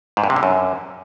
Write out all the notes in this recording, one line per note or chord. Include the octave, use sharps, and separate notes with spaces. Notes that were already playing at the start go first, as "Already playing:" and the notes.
G#2
G2
C3
D3
F#2